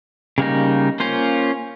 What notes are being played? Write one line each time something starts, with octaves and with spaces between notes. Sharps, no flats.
C#3 G3 A#3 D#4
A#3 C#4 F4 C5